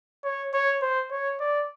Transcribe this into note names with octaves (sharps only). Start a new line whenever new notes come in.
C#5
C#5
C5
C#5
D5